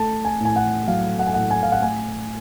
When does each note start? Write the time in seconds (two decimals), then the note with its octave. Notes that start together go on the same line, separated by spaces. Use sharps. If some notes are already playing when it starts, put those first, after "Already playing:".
Already playing: A3 A5
0.25 G#5
0.40 A2 G#5
0.56 F#5
0.87 F#3 F5
1.19 F#5
1.27 G#5
1.34 A2 F#5
1.51 G#5
1.63 F5
1.72 F#5
1.82 A3 G#5